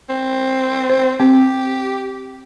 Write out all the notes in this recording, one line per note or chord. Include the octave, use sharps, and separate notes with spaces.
C4
C5
C4 G4